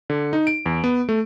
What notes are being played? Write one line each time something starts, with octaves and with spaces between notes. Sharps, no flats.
D3
D#4
D7
E2
B3
A3